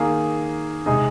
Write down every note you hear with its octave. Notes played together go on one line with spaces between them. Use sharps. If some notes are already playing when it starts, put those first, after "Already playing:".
Already playing: D#3 A#3 G#4
C3 G#3 D#4 G#4